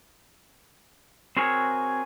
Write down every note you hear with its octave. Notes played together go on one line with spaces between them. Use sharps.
C4 F#4 G#4 A#4 C#5